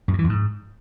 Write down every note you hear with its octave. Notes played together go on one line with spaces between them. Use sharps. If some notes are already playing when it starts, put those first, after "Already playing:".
F#2
G2
E3
F2
G#2